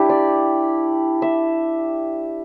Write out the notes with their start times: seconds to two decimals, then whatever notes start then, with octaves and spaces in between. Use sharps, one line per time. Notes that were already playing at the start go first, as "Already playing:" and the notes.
Already playing: D4 E4 G4
0.09 D5
1.22 E5